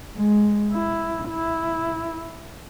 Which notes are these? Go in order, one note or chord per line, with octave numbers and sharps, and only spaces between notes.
G#3
E4
E4